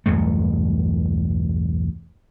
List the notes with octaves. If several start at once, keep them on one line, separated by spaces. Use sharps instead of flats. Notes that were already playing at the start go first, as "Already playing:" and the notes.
B1 E2 G2 A3